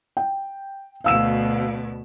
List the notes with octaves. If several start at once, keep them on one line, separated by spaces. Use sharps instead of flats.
G5
D2 B2 F5 E6 E7